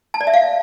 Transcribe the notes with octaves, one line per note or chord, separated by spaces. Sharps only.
A5
D5
E5
F5